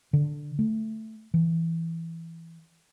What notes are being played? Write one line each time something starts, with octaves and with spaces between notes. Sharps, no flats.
D3
A3
E3